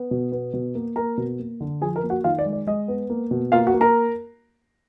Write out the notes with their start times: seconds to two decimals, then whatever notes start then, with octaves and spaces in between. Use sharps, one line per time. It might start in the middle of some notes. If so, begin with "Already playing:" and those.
Already playing: B3
0.11 B2
0.32 B3
0.53 B2
0.75 A#3
0.96 A#3 A#4 A#5
1.17 B2
1.39 A#3
1.60 D3
1.81 F3 G#4 G#5
1.96 A#4 A#5
2.03 A#3
2.10 F#4 F#5
2.24 D#3 F4 F5
2.39 D5
2.46 G#3
2.53 D5
2.67 G#3 D#5
2.88 B3
3.10 A#3
3.31 B2
3.52 A#3 F4 F5
3.67 F#4 F#5
3.74 A#3
3.81 A#4 A#5